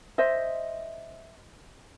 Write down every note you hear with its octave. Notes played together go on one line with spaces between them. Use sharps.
C5 D#5 E5